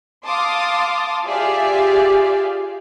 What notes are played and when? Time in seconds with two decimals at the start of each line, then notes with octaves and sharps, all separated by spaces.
0.25 F5 A5 C6 D6 D#6
1.26 F4 G4 G#4 D5 E5 F5